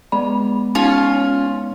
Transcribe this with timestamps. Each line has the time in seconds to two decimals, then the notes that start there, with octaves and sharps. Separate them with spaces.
0.12 G#3 B3 D5 B5
0.75 C#4 D#4 F4